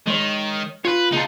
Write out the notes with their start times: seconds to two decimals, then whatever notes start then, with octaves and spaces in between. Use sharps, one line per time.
0.07 D#3 G#3 C#5
0.85 F4 B4 C#5
1.12 C#3 A#3 D#4 F4 A5